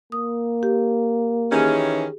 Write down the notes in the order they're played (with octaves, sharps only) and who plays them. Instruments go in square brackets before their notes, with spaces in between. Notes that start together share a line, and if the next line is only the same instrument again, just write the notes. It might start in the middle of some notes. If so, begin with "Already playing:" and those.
[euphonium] A#3 [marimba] D#6
[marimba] G4
[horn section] D#3 E3 C#4 [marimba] G4 G#4